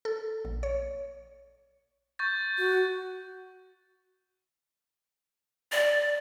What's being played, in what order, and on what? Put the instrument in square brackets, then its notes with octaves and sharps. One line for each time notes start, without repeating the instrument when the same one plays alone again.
[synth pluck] A4
A#1
C#5
[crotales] C#6 G6 A6
[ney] F#4
[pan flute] D5